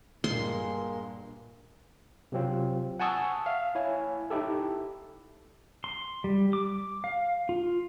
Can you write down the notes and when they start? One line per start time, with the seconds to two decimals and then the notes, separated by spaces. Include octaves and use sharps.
0.24 G2 A#2 G#3 A#3 C6
2.32 C3 F#3 C4 F4
3.00 F#5 G#5 A5 C#6 D#6 E6
3.46 E5 F5
3.75 E4 C#5 G#5
4.30 D#4 E4 G4 A4
5.84 C6
6.24 G3
6.53 D6
7.04 F5
7.49 F4